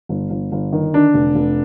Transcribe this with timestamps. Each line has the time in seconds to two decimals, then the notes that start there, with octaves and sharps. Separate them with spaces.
0.09 G1
0.30 G1
0.52 G1
0.73 D#3
0.93 D3 D4
1.14 F1
1.35 F1